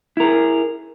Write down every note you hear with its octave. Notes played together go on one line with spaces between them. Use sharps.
E4 G#4 A#4